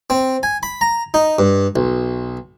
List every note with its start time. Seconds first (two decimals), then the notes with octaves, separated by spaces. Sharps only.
0.10 C4
0.43 G#5
0.63 B5
0.81 A#5
1.14 D#4
1.39 G2
1.76 B1